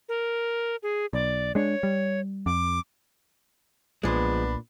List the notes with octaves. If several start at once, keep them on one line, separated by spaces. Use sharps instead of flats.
A#4
G#4
B1 D5
G#3 D4 C#5
G3
F2 D6
B1 A#2 F3 G#3 B3 D4 B5